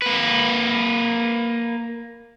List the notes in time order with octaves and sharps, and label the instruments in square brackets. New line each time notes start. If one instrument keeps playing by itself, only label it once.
[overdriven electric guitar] A#3 B4